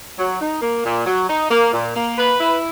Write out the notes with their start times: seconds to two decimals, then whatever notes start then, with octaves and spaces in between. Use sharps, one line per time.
0.19 F#3
0.41 D#4
0.62 A#3
0.85 A#2
1.06 F#3
1.29 D#4
1.50 A#3
1.73 A#2
1.95 A#3
2.17 B4
2.40 E4